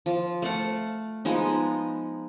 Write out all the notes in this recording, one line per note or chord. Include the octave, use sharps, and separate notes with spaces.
F3
A3 F5 F#5
F3 G#3 B3 D#4